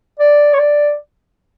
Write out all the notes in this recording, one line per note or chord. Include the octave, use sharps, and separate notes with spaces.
D5
C#5
D5